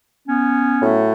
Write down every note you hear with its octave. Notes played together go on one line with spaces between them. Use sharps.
B3 C#4
A2 F#3 A3